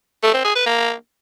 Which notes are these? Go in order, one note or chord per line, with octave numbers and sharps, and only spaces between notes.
A3
C4
G#4
B4
A#3